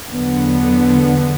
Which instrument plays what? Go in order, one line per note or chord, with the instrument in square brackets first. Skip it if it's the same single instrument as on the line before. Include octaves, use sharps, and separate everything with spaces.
[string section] E2 D3 F#3 B3